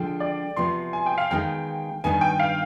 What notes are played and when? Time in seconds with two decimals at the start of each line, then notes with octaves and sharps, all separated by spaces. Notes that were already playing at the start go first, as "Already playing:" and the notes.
Already playing: D3 F3 G#3 G5
0.20 D5
0.56 C3 F3 B3 C6
0.93 G#5
1.06 G5
1.18 F5
1.31 D#3 G#3 B3 D#4 G5
2.04 G2 D#3 B3 D#4 G#5
2.21 G5
2.40 F5